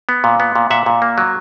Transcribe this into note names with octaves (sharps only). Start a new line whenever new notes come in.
B3
A#2
B3
A#2
A#2 E5 F#5
A#2
A#3
F#3